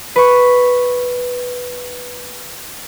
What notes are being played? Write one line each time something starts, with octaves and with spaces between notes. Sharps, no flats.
B4 C#6